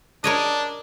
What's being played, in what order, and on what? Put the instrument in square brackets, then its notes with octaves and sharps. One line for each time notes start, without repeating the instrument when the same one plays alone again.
[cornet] D4 [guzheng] A#4 C#5 D#5